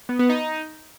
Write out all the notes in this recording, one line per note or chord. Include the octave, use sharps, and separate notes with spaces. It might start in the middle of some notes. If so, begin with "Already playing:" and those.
B3
B3
D#4